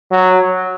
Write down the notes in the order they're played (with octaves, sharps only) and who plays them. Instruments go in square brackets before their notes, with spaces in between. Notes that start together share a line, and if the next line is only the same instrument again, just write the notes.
[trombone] F#3